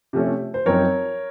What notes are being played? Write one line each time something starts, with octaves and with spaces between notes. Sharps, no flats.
C3 F3 A3 C#4
C5
F#2 F3 C4 D#4 A#4 C#5